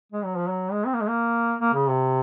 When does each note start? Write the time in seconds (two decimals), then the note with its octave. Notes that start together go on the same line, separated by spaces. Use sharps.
0.12 G#3
0.25 F#3
0.37 F3
0.49 F#3
0.72 G#3
0.86 C4
0.94 A#3
1.01 G#3
1.08 A#3
1.60 A#3
1.74 C#3
1.89 C3